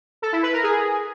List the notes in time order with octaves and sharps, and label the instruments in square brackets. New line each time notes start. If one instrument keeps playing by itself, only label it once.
[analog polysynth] A4
E4
B4
A#4
G#4